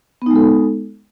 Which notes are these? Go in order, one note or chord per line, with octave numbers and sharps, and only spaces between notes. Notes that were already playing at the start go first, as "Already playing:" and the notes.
G#3 B3 D#4 A4